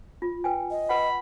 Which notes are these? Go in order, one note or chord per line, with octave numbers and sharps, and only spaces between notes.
F4
B4 G5 G#5
D#5
B4 F#5 B5